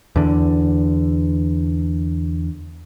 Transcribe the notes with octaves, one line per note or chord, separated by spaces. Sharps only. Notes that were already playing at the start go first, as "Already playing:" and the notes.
E2 D3